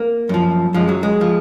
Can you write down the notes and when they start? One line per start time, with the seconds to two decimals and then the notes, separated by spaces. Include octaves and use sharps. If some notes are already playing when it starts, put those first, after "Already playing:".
Already playing: A#3
0.29 F#2 F3
0.74 F#2 F3 G#3
0.89 F#3
1.03 G#3
1.21 F3